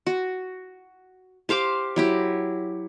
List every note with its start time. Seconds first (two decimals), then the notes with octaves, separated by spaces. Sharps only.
0.06 F#4
1.49 G4 C5 F5 D6
1.96 F#3 E4 G4